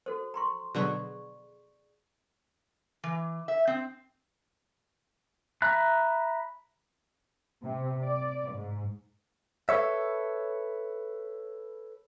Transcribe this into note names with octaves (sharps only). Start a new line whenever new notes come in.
F#4 A4 C5
A#5 C6 C#6
B2 D3 F#3 G#4 D5 C#6
E3
E5
C4
E5 A#5 B5 F#6
C3
D5
G#2
A4 B4 C#5 E5